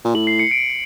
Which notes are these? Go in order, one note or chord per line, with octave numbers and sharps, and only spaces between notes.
A#2
A2 F#7
C7
C#7
D7